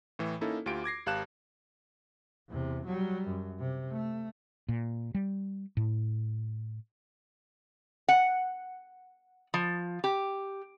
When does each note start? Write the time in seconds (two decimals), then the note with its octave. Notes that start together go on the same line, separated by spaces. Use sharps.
0.19 A2 E3
0.41 A#3 C#4 D#4 E4 A4
0.66 D2 F4 G4 D7
0.84 D6 G#6 A#6 C7
1.06 G#1 G4 F5 A5 F#6 E7
2.50 E2 C3
2.87 F#3 G3
3.28 F#2
3.60 C3
3.91 A3
4.69 A#2
5.15 G3
5.77 A2
8.08 F#5
9.54 F3
10.04 G4